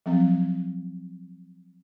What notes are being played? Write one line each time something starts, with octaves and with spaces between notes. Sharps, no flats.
F3 F#3 C4